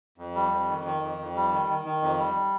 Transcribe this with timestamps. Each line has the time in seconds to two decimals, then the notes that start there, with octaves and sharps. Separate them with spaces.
0.18 F2
0.35 G3
0.51 F2
0.68 D#3
0.85 D#3
1.01 F2
1.18 F2
1.35 G3
1.52 D#3
1.68 D#3
1.85 D#3
2.02 F2
2.18 G3